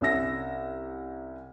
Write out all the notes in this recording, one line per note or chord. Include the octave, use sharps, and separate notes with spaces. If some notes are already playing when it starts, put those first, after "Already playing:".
C2 C#4 E5 E6 A#6